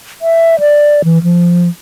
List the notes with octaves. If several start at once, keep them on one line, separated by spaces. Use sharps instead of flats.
E5
D5
E3
F3